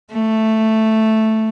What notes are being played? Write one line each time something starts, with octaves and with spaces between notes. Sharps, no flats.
A3